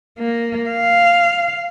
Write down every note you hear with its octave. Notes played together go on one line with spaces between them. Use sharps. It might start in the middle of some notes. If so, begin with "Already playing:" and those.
A#3
F5